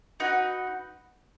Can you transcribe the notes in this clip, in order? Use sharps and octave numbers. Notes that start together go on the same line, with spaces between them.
D#4 F#4 B4